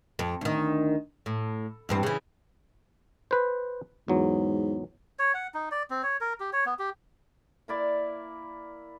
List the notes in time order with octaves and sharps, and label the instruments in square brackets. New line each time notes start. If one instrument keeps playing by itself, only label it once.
[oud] F2
D2 D#3
A2
E2 G2 C4
C#3 E3
[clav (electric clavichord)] B4 C5
[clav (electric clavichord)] E2 F#3 [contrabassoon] G#2
[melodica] C#5
F#5
D#4
D5
C4
C#5
A#4
G4
C#5
B3
G4
[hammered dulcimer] A#3 E4 D5